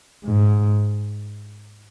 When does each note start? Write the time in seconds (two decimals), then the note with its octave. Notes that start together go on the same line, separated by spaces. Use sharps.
0.24 G#2